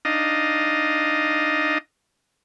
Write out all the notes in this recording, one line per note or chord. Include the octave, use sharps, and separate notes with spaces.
D4 D#4 D#5 F5